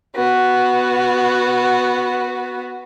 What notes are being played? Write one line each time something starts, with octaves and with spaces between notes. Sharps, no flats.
B3 F#4